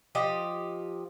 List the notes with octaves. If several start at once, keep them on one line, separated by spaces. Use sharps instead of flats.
F3 G4 D#5